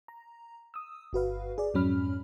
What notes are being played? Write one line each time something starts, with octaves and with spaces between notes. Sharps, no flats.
A#5
D#6 E6
G1 F#4 B4 F5
G#4 D5
F2 G#2 F#3 C#4 B5 F6